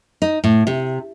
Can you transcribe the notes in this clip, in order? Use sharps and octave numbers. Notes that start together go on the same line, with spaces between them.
D#4
A2
C3